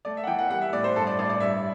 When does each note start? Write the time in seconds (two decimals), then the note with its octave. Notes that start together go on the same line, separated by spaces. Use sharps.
0.05 A3 D5
0.17 E5
0.24 F#5
0.27 E3 G5
0.39 F#5
0.50 G3 F#5
0.62 E5
0.73 A2 D5
0.84 C5
0.96 G2 A4
1.07 D5
1.19 A1 D5
1.30 D5
1.40 G2 E5